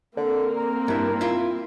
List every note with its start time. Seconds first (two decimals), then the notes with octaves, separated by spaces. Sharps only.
0.17 D3 A#3 C4
0.56 A#4
0.88 G2 E4
1.21 E4 F4